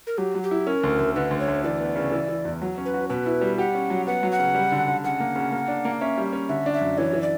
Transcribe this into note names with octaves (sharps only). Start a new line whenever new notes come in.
A#4
F#3 G4
F#3
G4
E4
C#4 A#4
D2
D2
D3 B4
D2
C#5
D2
E3 D5
B3
C#3
E3
E3
E2
F#3
C#4
B4
F#4
B2 B4
E4
G3
G4 F#5
C#4
F#3
B3 F#5
F#3
F#5
C#3
G3
D3
D3
C#3 F#5
A#3
C#3
A#3
D4
A#3
C#4 E5
G3
C#4
D3 E5
D4
E5
F#2
E3 C#5
E3
D5